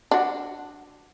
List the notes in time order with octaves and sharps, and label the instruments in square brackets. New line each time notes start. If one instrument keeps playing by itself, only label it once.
[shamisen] D4 F#4